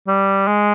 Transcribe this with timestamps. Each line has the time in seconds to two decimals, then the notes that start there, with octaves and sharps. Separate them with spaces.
0.07 G3
0.47 G#3